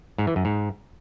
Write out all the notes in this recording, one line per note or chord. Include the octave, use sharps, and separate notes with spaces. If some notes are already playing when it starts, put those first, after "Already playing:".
G#2
E3
F#2
G#2